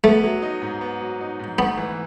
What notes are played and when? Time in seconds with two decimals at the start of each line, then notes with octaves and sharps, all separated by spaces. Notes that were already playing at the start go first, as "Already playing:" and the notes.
0.04 A3 B3
0.23 F#3
0.42 D#4
0.62 G#2
0.81 B3
1.01 F#3
1.20 D#4
1.39 G#2
1.59 A3 B3
1.78 E3